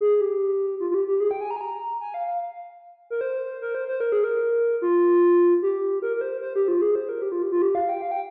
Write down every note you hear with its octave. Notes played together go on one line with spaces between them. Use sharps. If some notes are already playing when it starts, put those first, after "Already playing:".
G#4
G4
F4
F4
G4
G4
G#4
G5
G#5
A#5
G#5
A#5
G#5
F5
F5
A#4
C5
A#4
C5
C5
A#4
G#4
A#4
F4
G4
A#4
A#4
C5
C5
G4
F4
G#4
C5
A#4
G4
F4
G4
F4
G4
F5
G5
F5
G5